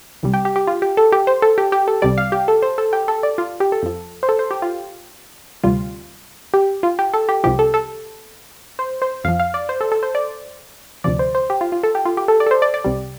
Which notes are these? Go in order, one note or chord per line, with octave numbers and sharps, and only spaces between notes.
C2 C3 G3
G4
G4
G4
F4
G4
A4
G4
C5
A4
G4
G4
A4
C2 C3 G3 D5
F5
G4
A4
C5
A4
G4
A4
D5
F4
G4
A4
F2 F3
C5
A4
C5
G4
F4
D2 C3 G3 F4
G4
F4
G4
A4
G4
C2 C3 F3 G4
A4
A4
C5
C5
F2 F3 F5
F5
D5
C5
A4
A4
C5
D5
D2 C3 F3 D5
C5
C5
G4
F4
F4
A4
G4
F4
G4
A4
D5
A4
C5
D5
D5
C2 C3 G3